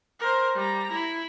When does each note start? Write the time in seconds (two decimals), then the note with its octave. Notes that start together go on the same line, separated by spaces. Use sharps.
0.20 A#4 C5
0.55 G3 A#5
0.92 E4